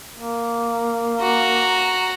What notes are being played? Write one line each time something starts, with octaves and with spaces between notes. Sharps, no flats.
A#3
F#4 A#5